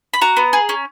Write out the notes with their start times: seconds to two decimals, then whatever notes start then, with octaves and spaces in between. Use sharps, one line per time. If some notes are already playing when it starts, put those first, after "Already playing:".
0.14 B5
0.21 F#4 A#5
0.37 B3
0.53 G#4
0.69 C#4